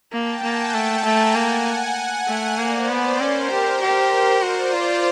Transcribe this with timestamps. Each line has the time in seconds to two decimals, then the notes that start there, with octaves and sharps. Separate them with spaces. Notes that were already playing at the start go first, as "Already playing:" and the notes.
0.12 A#3 G5 A5
0.43 A#3 F#5 G#5
0.74 A3 G5 A5
1.04 A3 G#5 A#5
1.35 A#3 F#5 G#5
1.97 F#5 G#5
2.28 A3
2.58 A#3 C5 D5
2.88 B3
3.20 C#4 A#4 C5
3.51 G4
3.81 G4 A#4 C5
4.42 F#4 C5 D5
4.73 F4